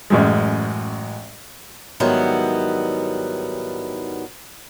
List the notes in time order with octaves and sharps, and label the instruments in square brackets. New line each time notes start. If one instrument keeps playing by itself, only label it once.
[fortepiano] A1 F#2 G#3
[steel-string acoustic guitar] G#2 D#3 F#3 G3 B3 E4